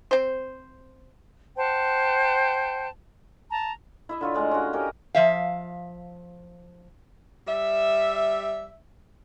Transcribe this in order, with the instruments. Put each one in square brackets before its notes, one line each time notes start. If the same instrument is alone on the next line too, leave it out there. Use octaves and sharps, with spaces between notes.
[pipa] C4 C5
[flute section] C5 F#5 G5 A5
A5 A#5
[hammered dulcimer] E4 D#5 E5
D3 F4 C#5
A2 G#3 D5 A#5
C#4 F#4
C#4 G4 A#4 D#5
[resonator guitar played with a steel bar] F3 E5 F5
[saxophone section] G3 E5